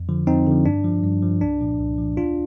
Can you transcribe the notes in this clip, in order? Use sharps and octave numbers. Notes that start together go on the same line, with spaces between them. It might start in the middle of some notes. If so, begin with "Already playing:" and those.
Already playing: F2
D3 F3
F2 C4 D#4
D3 F3
G2 D4
F3
G2
F3
C2 D4
A#2 F3
C2
A#2 F3
D#2 D4 F4